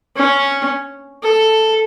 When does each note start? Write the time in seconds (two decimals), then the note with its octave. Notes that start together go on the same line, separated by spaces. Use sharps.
0.16 C#4
1.23 A4